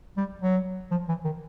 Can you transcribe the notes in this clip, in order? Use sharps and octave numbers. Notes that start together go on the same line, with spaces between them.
G3
F#3
F3
E3
D#3